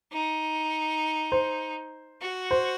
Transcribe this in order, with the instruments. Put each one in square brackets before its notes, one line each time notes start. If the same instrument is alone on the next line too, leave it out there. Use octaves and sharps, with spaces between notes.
[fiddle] D#4
[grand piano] C5
[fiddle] F#4
[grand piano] C5